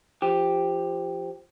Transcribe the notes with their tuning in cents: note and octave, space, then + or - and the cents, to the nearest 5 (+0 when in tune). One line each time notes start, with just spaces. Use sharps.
F3 -10 G4 +5